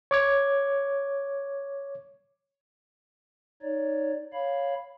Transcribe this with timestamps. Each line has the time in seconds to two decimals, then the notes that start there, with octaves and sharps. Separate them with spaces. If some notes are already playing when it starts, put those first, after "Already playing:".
0.11 C#5 D6 G#6
3.62 D#4 C#5 D5
4.33 C#5 F5 B5